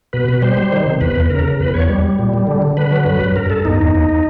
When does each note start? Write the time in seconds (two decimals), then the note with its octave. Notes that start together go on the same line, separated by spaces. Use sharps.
0.13 B2 B4
0.29 B2
0.42 G3 C5
0.57 G3
0.72 D#3
0.86 C3
1.01 E2 B4
1.16 E2
1.30 C#3 A#4
1.45 C#3
1.60 E2 B4
1.74 E2 C#5
1.89 G3
2.04 G3
2.19 A#2
2.33 G3
2.47 D3
2.62 D3
2.77 D3 B4
2.91 F#3
3.06 G2 B4
3.21 G2
3.35 G2 A#4
3.50 G2 A4
3.65 E2 D#4
3.80 E2
3.95 E2